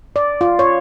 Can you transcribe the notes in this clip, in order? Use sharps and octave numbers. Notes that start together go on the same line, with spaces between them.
D5
F4
C#5